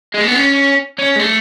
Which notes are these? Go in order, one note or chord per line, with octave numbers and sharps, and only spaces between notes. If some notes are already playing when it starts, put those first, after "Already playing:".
G#3
A3
B3
C#4
C#4
G#3
A3